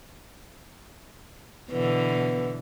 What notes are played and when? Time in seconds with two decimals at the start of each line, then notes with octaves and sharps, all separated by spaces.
1.71 B2 D3 E3 B3